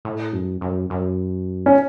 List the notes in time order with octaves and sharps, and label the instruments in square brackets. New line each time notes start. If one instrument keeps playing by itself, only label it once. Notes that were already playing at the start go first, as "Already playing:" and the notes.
[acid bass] A2
F#2
F#2
F#2
[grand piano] C#4